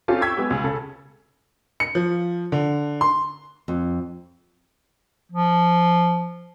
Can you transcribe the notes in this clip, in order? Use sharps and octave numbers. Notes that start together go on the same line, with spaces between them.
C4 C#4 F4 G4 A4
G5 C#6 E6 G#6 B6
G#3 B3 G4
C#2 G#5
C#3 A4
C#7
F3
D3
C6
F2
F3